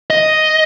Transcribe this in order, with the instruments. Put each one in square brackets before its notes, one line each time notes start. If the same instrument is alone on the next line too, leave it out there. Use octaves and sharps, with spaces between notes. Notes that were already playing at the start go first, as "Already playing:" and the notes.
[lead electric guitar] D#5